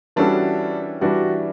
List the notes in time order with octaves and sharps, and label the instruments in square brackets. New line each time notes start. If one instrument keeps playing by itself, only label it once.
[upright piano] E3 G3 C#4 F#4 A4 [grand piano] D4
[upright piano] E3 G3 D4 [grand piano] F#4